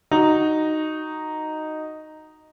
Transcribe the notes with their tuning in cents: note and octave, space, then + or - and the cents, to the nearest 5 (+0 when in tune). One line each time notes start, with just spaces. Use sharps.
D#4 -5 F#4 +0